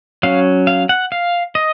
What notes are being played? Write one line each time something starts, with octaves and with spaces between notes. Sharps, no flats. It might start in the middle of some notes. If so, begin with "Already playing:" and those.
F#3 C#4 F5
F5
F#5
F5
D#5